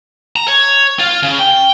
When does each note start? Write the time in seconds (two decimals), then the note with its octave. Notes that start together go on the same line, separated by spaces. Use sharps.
0.36 A#5
0.48 C#5
0.99 F4 F5
1.23 C#3
1.39 G5